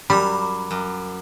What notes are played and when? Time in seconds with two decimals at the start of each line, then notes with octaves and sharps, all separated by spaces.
0.10 F#2 G3 A#5 B5 D6
0.71 F#2